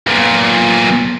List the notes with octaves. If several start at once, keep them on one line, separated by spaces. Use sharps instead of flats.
B1 A#2